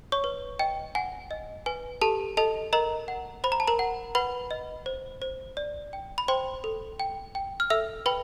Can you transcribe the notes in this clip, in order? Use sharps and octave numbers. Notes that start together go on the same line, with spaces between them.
C#5 C#6
B4
D#5 G5
F#5 G#5
D#5
B4 G#5
G4 A4 A5
A4 D#5 A5
A#4 D#5 A#5
F#5
C5 B5
A#5
A5
A#4 A#5
F#5
B4 F#5 B5
D#5
C5
C5
D5
G5
B5
C5 G5 C6
A4
G5
G5
F6
A4 E5 E6
B4 G5 B5